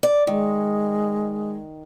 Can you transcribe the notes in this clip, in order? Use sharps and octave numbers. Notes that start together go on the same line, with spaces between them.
D5
D#3 G#3